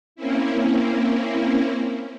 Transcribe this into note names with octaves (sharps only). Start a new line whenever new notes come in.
A#3 C4 C#4 E4